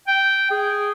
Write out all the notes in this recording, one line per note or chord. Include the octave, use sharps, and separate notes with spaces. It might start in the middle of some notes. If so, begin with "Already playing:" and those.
G5
G#4